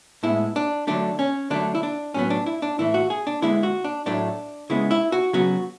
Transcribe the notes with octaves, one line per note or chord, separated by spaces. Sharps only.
A2 G#3 B3 E4
D4
D3 F#3 A3 D4
C#4
D3 F#3 A3 D4
E4
D4
A2 F#3 B3 C#4
D4
E4
D4
A2 E3 A3 E4
F#4
G#4
D4
D3 G#3 B3 E4
F#4
D4
A2 F#3 A3 D4
C#3 G#3 B3 E4
E4
F#4
C#3 F#3 B3 F#4